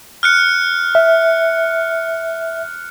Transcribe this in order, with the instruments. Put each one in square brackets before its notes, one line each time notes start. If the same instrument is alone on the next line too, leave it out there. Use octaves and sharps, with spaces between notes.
[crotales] F6 F#6 C#7
[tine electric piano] E5